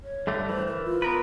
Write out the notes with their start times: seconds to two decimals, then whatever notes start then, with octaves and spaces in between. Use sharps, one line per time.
0.03 C#5
0.27 G2 D3 A3
0.49 E3 C5
0.68 A#4
0.84 F4
1.02 B3 A#4 B4